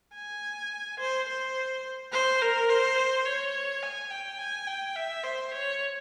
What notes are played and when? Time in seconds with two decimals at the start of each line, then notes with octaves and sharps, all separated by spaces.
0.15 G#5
1.00 C5
1.28 C5
2.12 C5
2.42 A#4
2.69 C5
3.26 C#5
3.83 G#5
4.10 G5
4.38 G#5
4.67 G5
4.96 E5
5.23 C5
5.51 C#5